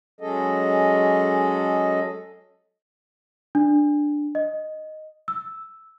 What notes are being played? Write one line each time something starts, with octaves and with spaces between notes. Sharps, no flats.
F#3 G#3 C#4 G#4 A4 D#5
D4
D#5
E6